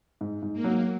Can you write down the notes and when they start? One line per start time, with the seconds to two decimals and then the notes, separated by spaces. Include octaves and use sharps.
0.21 G#2
0.42 G#2
0.53 A#3
0.64 F#3